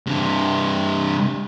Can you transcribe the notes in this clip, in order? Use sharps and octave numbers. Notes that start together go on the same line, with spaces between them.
G2 C3